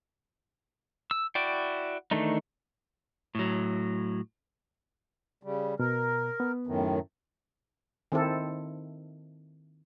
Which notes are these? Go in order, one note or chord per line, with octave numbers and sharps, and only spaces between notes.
E6
E4 F#4 D5 G5
D#3 E3 A3 D4 D#4
A2 F#3
C#3 G3
B2 A#4
B3
F#2 A2 D#3
D#3 C4 E4 A4